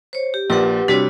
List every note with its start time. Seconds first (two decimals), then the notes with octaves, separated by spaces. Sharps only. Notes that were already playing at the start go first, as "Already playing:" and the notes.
0.13 C5 C#5
0.34 G4
0.50 A#1 A#2 G4 B4 F#5
0.88 C3 G3 D4 F#4 C#5 B6